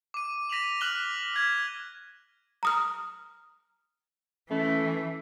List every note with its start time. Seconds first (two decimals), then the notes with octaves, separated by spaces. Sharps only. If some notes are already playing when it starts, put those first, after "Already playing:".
0.14 D6 D#7
0.50 A#6 B6 D#7 F7 F#7
0.81 D6 F6 F#6 F#7 G7
1.34 F6 G#6 B6
2.63 A#5 D#6 F6
4.51 E3 A3 C#4